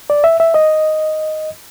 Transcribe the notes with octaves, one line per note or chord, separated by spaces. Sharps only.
D5
E5
E5
D#5